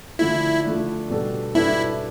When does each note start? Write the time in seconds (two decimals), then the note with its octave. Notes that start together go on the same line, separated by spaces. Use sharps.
0.19 D3 F3 A3 D4 E4
0.64 D3 F3 A3 D4
1.10 B2 G3 B3 D4 A4
1.55 B2 G3 B3 D4 E4 A4